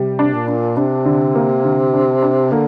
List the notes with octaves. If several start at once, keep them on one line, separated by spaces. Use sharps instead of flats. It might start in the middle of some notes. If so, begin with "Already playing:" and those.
Already playing: C3 G3
D4
A#2
D4
C3 D4
D3
A#3
D3
D4
D4
D3 A#3